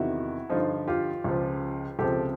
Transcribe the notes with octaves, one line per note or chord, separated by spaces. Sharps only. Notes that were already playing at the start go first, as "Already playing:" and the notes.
Already playing: E2 C3 D#3 E4 F#4
G2 D3 F3 D#4 F4
F4 G4
C#2 C#3 F3
C#2 C3 F3 G4 A4